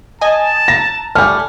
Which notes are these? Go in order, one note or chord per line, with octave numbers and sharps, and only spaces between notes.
D#5 G#5 A5
A#5 A#6
G3 A3 G#5 F6